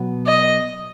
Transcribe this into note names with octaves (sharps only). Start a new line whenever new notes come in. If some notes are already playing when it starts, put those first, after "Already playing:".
Already playing: B2 F#3 B3 F#4
D#5